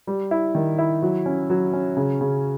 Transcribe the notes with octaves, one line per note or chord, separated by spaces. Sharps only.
G3
E4
D#3
E4
F#3
C#4
F#3
C#4
C#3
C#3